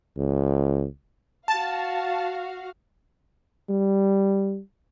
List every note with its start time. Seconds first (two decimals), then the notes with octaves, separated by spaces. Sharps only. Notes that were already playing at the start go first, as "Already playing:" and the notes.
0.17 C#2
1.48 F#4 F5 A5
3.70 G3